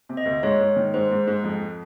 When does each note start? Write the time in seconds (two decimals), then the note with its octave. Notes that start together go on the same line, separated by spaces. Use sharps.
0.09 C3
0.17 D#5
0.25 D2
0.43 G#2 C#5
0.60 G#2
0.76 D#3
0.94 G#2 C5
1.11 G#2
1.27 G#2
1.44 F2